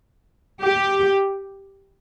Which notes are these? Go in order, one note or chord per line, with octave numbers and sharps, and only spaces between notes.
G4